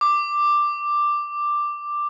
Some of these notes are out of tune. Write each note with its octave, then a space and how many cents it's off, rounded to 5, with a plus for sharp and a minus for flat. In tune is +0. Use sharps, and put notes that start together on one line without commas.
D6 +5